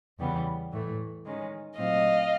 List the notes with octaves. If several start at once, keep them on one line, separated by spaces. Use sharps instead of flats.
E2 C#3 E3 G3 B3
A2 E3 A3
D#3 G#3 C#4
A#2 F#3 A3 C4 D#5 F5